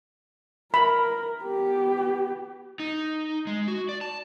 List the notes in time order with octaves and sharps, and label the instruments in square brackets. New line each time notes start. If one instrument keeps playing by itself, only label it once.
[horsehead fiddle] A#4 [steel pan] B5
[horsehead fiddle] B3 G4
[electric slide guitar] D#4
G#3
F#4
D5
A5